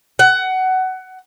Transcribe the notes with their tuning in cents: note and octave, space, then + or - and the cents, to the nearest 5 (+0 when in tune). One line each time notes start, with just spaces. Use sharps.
F#5 +20